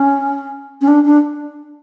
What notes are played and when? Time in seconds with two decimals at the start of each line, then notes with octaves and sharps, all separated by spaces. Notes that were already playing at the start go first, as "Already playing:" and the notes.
Already playing: C#4
0.81 C#4
0.87 D4
1.05 D4